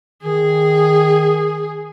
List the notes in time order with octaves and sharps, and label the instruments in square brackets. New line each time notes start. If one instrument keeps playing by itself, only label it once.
[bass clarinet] D#3 [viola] G#4